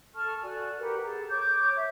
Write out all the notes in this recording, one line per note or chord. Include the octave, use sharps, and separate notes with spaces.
A4 A5 C#6 F6
F#4 A4 D5 G#5
G4 A#4 B4 F#5
G#4 A4 A#5
C#5 C#6 D6 G6
E5